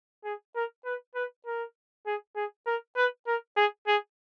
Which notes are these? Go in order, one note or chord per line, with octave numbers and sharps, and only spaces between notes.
G#4
A#4
B4
B4
A#4
G#4
G#4
A#4
B4
A#4
G#4
G#4